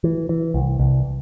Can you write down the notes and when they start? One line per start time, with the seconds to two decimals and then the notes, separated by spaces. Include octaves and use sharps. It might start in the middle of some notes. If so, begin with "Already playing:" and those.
0.04 E3
0.29 E3
0.54 C2
0.79 C2